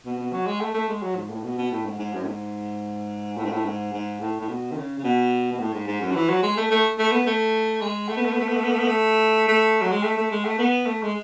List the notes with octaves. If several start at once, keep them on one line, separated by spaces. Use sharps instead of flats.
B2
B2
F#3
G#3
A3
A3
G#3
F#3
G#2
A2
B2
B2
A2
G#2
G#2
F#2
A2
G#2
A2
G#2
A2
G#2
G#2
A2
A2
B2
D#3
C#3
C#3
B2
B2
A2
G#2
G#2
F#2
F#3
E3
F#3
G#3
A3
A3
A3
B3
A3
G#3
A3
B3
A3
B3
A3
B3
A3
B3
A3
B3
A3
A3
F#3
G#3
A3
A3
G#3
A3
B3
A3
G#3